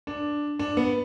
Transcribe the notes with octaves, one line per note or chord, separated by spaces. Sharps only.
D4
D4
B3